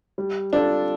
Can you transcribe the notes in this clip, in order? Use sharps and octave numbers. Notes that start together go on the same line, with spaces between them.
G3
D4 F4 A4